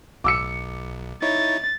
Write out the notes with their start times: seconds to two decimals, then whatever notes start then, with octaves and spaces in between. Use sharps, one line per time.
0.24 B1 D6 E6 C#7
1.22 D#4 E4 C#5 A6